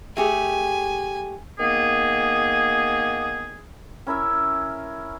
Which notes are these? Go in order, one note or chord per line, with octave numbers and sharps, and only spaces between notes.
A3 G4 G#4 G#5
D#3 A#3 B3 G#4
C#4 E4 A#4 E5